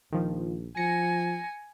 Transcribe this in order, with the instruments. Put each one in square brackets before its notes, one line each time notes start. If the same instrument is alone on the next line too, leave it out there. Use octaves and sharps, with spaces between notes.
[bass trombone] A#1 [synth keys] D#3 F3
[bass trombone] F3 [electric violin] G#5 [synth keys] A#6 C#7